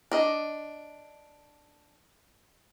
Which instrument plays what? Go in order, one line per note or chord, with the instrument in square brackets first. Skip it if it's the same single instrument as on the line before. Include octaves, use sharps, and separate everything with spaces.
[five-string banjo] D4 D#5